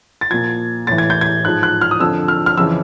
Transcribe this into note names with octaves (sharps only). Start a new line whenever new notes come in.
A6
A#2 F3 G#6
A2 E3 A6
G#6
G6
G#6
G#2 F3 F#6
F#6
F6
D#6
F2 D3 F3 E6
F6
F6
F2 C#3 E3 E6